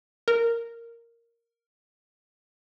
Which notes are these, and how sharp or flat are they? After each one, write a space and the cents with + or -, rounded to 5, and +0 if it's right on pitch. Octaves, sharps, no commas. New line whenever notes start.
A#4 -5